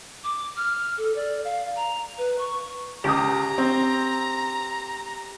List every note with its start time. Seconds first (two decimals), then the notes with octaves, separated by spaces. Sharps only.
0.24 D6
0.57 F6
0.98 A4
1.16 D5
1.44 F5
1.76 A#5
2.18 B4
2.39 C#6
3.04 C#2 G4 A#5 D#6
3.58 C4